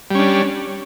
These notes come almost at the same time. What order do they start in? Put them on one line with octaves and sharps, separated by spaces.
G3 C#4 D4